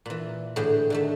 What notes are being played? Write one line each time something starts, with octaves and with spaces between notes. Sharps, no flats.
A#2 E3
A2 D3 E3 G#4 G5
D3 D#3 A3